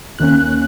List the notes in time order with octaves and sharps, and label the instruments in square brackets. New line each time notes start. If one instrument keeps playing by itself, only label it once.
[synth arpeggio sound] D#2 D#3 A#3 C#4 F#6